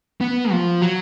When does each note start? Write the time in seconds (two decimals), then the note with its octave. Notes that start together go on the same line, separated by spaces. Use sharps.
0.21 B3
0.51 F3
0.82 F#3